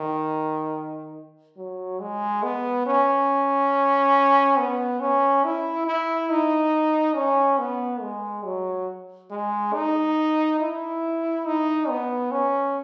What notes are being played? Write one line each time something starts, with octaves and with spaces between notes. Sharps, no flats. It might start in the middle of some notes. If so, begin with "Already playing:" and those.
Already playing: D#3
F#3
G#3
B3
C#4
B3
C#4
E4
E4
D#4
C#4
B3
G#3
F#3
G#3
D#4
E4
D#4
B3
C#4